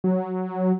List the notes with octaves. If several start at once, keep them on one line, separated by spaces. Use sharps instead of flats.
F#3